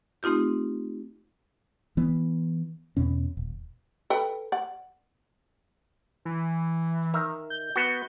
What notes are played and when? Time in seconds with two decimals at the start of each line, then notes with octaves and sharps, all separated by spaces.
0.23 A3 C4 D#4 F4 G4
1.97 E3 B3
2.97 E2 B2 C#4
3.37 D#1
4.10 A4 B4 G5
4.52 D5 F#5
6.25 E3
7.14 D#3 E5 A#5
7.50 G6
7.76 B3 F#4